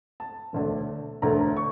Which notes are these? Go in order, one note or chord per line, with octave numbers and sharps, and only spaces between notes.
A5
E1 D2 D3 A3 D4
E1 D2 D3 A3 D4 A#5
C#6